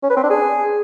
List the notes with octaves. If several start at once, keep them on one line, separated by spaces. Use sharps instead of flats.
C#4
B4
C4
D4
G#4